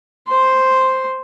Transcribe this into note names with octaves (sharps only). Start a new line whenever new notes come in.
C5 C6